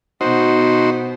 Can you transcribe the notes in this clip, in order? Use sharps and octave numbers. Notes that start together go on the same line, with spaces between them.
B2 D#4 F#4 C5